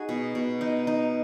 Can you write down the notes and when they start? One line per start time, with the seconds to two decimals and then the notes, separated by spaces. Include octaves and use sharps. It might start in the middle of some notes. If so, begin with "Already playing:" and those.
Already playing: D#4 F#4 G#4
0.09 B2
0.35 B2
0.61 D#4
0.87 D#4